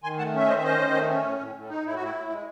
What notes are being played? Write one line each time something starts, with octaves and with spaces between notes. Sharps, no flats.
D#3 G#5 C6
A3 F#5 A5
C#4 E5
D#3 C5 D#5
E5
C#4 C5 D#5
D#3
A3
C#4
A2
A2
A2
D#4
A2 E4
F#4
A2 E4
A2
G#3